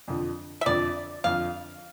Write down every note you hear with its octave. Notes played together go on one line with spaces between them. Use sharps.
F2 D3 F3
E5
F2 D3 F3 D5
F2 D3 F3 F5